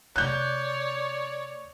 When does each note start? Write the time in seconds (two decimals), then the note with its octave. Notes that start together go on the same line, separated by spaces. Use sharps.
0.16 C3 A3 C#5 D5 F#6 G6